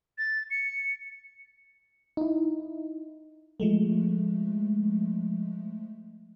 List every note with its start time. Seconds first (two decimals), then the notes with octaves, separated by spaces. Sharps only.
0.18 A6
0.50 C#7
2.17 D#4 E4
3.60 F3 G#3 A3